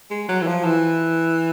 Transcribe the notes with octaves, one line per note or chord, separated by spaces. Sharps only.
G#3
F#3
E3
F3
E3